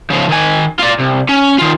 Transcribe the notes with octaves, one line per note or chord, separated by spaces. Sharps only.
C#3 F3
D#3 G#5
F4 D5
C2
C#4
D#3 F4